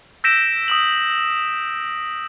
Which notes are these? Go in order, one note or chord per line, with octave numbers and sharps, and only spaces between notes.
E6 G6 A#6 B6 D7 E7
D#6 E6 F#7